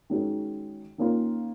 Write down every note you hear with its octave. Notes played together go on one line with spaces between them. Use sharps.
D#3 G#3 C#4 F#4
D#3 A#3 C#4 F4